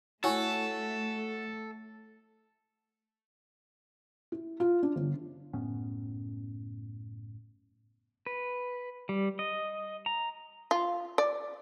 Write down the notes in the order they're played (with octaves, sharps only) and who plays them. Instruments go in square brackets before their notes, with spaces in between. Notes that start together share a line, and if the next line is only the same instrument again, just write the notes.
[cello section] A3 [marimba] E4 G#5 C#6 [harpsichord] F#4 C#5 [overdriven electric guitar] A4
[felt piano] E4
F4
D4
G1
[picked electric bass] F#1 A2 B3 C#4
[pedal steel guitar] B4
G3
D#5
A#5
[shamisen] F4
D5